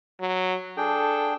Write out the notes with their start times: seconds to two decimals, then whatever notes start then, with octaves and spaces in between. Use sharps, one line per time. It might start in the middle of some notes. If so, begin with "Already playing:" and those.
0.21 F#3
0.77 D4 G#4 A4 G5